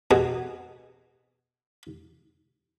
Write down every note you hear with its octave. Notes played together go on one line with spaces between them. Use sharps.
B2 G#4